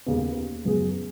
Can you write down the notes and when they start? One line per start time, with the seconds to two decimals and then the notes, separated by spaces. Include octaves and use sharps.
0.06 D#2 C#3 B3
0.65 F#2 C#3 B3 G#4